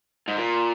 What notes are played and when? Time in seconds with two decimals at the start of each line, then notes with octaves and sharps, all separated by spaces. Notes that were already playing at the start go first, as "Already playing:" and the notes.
0.28 G#2
0.37 A#2